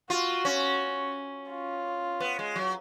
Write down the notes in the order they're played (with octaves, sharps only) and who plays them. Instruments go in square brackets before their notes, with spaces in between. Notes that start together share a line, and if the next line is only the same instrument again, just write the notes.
[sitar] F4 [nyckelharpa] F#4
[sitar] C#4
[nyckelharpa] F4
[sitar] B3
G#3
F#3